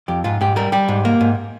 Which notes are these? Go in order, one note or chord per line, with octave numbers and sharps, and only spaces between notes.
F2 G4
G#2 F4
G#2 G4
G3 A#4
G3 G4
G#2
A#3
G#2